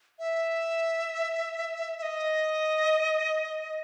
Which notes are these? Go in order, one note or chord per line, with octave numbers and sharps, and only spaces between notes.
E5
E5
D#5